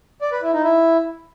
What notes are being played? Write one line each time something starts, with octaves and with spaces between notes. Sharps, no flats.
D5
B4
E4
D#4
E4